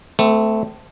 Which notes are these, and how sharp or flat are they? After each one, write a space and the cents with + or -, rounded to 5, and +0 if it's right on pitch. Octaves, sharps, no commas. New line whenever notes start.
A3 +0 C4 -35